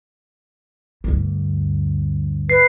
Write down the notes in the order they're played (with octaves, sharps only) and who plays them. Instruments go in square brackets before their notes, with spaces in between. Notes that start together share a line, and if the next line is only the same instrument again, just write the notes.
[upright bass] D2 G2
[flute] B4 [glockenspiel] C7